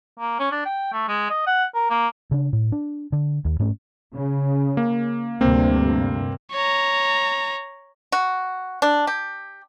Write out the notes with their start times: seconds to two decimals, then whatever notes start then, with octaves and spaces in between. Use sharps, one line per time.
0.20 A#3
0.39 C#4
0.52 D4
0.65 G5
0.93 A3
1.08 G#3
1.30 D#5
1.47 F#5
1.74 A#4
1.90 A#3
2.31 C#3 D4
2.53 A2
2.72 D4
3.12 D3
3.45 D#2
3.59 G#2 A3 C#4
4.15 C#3
4.77 A#3
5.41 D2 G2 C3 A#3 C4
6.52 C#5 A#5
8.12 F#4
8.82 D4
9.07 G4